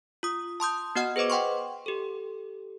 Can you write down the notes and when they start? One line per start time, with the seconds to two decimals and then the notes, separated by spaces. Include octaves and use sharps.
0.23 F4 D#6
0.60 A5 C6 D#6 G6
0.96 B3 F#4 D#5 F#5 F6
1.16 G#4 B4 C5 D#5 D6
1.30 F#5 G5 C6 C#6
1.86 G4 A4